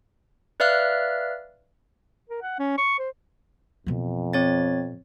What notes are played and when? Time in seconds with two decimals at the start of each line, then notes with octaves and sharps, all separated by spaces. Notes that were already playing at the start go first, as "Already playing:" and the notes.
0.60 B4 D5 E5 F5 F6 F#6
2.30 A#4
2.42 F#5
2.59 C#4
2.78 C#6
2.99 C5
3.86 F2 B2 E3
4.33 C4 C#5 A6